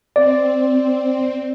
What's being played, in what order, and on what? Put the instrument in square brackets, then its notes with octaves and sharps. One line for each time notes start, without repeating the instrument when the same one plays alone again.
[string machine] C4 [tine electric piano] D5